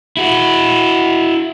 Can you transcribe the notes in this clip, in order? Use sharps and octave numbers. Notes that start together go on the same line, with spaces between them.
E4 F#4